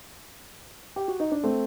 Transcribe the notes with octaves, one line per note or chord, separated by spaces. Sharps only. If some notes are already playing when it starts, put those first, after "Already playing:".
G4
F#4
D#4
D4
A3 C4